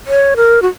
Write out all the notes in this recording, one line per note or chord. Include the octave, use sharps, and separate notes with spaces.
C#5
A#4
F#4